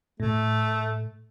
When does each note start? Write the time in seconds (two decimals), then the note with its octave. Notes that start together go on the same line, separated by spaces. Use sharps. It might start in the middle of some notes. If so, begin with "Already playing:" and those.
0.20 A2 A3